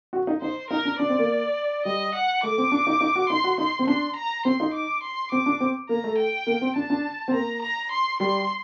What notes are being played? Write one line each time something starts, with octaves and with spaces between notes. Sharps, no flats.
F#4
D#4
D#4 C5
D#4 A#4
D4
D4 D5
C4
A#3
G3 D#5
F#5
A3 D6
C4
D4
D#4
D#4
F#4
D#4 C6
F#4
D#4 C6
C4
D4 C6
A#5
C4 C6
D#4
D6
C6
C4 D6
D4
C4
A#3 A#5
A3
G5
A#3
C4
D4 A5
D4
C4
A#3 A#5
A#5
C6
G3 C6